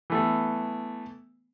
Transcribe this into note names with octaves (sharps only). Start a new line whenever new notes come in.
E3 A3 B3